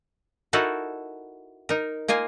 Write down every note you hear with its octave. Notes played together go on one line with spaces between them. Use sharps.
D#4 E4 F#4 A4 A#4
D#4 A#4
A#3 F4 D#5 G#5